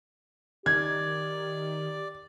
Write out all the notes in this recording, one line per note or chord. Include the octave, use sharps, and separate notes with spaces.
D#3 G4 D5 G#6